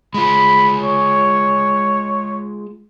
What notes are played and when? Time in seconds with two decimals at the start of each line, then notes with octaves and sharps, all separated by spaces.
0.14 G#3 F4 B5
0.83 C#5